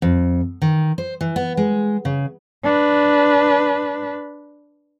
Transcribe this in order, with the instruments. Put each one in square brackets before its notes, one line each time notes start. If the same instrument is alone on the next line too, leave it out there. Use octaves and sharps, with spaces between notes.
[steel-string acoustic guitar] F2
D#3
C5
E3
B3
G#3
C#3
[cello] D4 B4